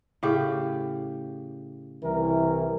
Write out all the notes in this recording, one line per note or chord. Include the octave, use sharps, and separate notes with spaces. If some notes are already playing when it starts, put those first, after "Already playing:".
A2 C#3 G4
C2 E3 A#4